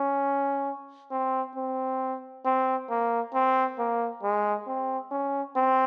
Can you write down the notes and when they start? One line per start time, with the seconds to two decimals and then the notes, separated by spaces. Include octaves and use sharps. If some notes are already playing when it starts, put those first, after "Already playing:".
Already playing: C#4
1.11 C4
1.56 C4
2.45 C4
2.90 A#3
3.34 C4
3.79 A#3
4.23 G#3
4.67 C4
5.11 C#4
5.56 C4